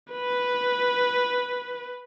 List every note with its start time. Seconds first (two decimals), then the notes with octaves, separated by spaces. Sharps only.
0.12 B4